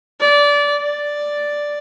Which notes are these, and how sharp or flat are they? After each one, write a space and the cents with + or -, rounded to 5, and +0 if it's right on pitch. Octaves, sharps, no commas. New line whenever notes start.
D5 -20
D5 +0